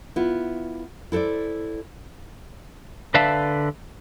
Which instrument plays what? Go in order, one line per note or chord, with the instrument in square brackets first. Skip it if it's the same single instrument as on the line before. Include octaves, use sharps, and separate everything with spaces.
[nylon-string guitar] B3 E4 F4
E4 A4 B4 C5 D5
[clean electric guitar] D3 B4 D5 E5 F5 A5